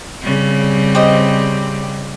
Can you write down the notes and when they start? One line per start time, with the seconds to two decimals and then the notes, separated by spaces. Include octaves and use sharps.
0.22 C#3 G3 C4
0.95 G4 C5 D#5